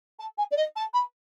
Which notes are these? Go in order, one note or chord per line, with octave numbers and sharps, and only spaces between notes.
A5
G#5
D5
D#5
A5
B5